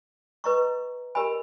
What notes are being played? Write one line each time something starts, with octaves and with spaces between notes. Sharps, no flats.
B4 D#5 A#5 C#6
G4 A#4 D#5 G#5 B5